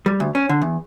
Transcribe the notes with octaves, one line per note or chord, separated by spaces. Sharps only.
G3
D2
C#4
D3
E2